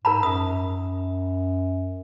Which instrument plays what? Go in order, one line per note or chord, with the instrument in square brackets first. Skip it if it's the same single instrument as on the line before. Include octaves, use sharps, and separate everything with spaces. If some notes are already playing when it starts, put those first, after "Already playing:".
[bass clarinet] G#2 [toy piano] A#4 A#5 B5
[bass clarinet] F#2 [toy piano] D#6